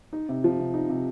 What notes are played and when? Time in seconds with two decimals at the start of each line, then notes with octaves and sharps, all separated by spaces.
0.13 D#4
0.29 C3
0.44 F3
0.59 C3
0.74 D#4
0.89 C3